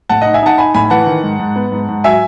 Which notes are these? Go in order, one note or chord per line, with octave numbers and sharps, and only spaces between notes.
A2 F#5 A5
D#4 D#5 F#5
E5 G#5
D#4 F#5 A5
D#4 G#5 B5
A2 G#5 B5
G#5
E3 F#5 A5
D#3
G#2
G#2
B3
G#2
G#2
F#3 E5 G#5